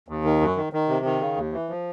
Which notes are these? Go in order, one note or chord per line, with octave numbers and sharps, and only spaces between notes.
D#2
D#3
F#2
D#3
D#3
C3
D#3
C#3
D#2
E3
F3